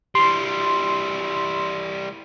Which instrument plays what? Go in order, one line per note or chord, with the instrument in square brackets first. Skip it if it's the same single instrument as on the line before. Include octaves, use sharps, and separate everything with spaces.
[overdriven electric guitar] E3 G3 [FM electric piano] C6